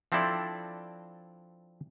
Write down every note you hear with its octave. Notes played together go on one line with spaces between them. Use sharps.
F3 C4 D4 E4 A4 D5